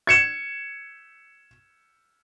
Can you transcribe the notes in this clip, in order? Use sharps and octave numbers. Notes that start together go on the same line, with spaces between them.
G#6 C#7 E7